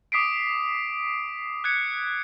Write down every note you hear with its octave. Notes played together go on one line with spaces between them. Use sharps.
D6 D#6 B6 C7 D7
F#6 G#6 C#7